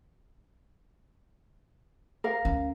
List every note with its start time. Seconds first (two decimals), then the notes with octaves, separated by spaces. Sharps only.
2.24 A#4 F5
2.45 D2 C#4